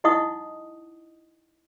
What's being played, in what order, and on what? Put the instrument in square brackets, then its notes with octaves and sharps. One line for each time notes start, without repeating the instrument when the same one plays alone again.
[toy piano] D#4 E4 D#5 F#5 C#6 D#6